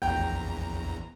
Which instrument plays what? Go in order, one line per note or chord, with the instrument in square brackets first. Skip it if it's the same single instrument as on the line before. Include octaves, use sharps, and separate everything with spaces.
[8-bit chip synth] A#1 E2 A#5 [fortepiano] G5